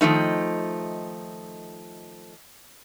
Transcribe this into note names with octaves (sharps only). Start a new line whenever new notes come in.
D#3 F3 A3 D#4